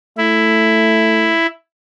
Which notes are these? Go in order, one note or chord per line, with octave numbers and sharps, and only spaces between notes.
A3 E4